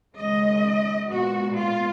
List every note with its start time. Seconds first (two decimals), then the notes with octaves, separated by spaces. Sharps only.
0.17 D#2 C#3 G#3 D#5
1.10 A#2 G#3 B3 F#4
1.57 F4